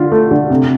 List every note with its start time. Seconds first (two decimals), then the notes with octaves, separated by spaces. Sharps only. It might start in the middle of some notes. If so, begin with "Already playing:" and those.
Already playing: D3 F4
0.12 A3
0.31 D3
0.50 C3